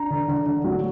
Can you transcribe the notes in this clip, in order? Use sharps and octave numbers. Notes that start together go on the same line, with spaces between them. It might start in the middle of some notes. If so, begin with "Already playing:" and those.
Already playing: D4 A#5
D3
D3
D3
F#3